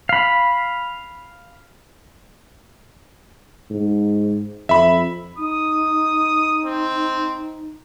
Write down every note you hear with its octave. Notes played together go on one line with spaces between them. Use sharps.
F5 B5
G#2
F2 E5 B5
D#4 D#6
C4